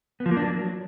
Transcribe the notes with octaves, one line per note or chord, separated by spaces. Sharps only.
B3
F3
A#3
D4
F#3